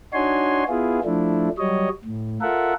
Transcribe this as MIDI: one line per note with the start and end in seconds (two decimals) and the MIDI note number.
0.13 0.64 62
0.13 0.64 63
0.13 0.64 66
0.13 0.64 73
0.13 0.64 80
0.13 0.64 84
0.69 1.00 59
0.69 1.00 64
0.69 1.00 65
0.69 1.00 68
1.05 1.49 53
1.05 1.49 57
1.05 1.49 62
1.05 1.49 64
1.58 1.89 54
1.58 1.89 55
1.58 1.89 73
1.58 1.89 75
2.05 2.38 45
2.41 2.74 65
2.41 2.74 69
2.41 2.74 70
2.41 2.74 76
2.41 2.74 78